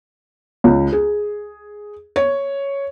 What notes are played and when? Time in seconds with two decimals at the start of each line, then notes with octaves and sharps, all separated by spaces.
0.64 C#2
0.92 G#4
2.16 C#5